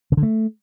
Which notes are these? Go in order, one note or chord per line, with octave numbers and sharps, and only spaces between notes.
C#3
D3
A3